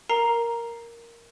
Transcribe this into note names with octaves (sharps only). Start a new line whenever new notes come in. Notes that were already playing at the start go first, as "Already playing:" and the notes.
A#4 A#5 C7